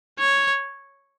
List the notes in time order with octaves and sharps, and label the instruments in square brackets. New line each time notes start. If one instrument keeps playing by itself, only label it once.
[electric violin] C#5